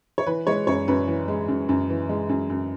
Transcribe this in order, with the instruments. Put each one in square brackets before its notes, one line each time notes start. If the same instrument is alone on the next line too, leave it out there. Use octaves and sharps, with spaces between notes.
[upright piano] C#5
E3 B4
G#3 C#5
F#2 C#5
F#2 B4
E3
G#3
F#2
F#2
E3
G#3
F#2
F#2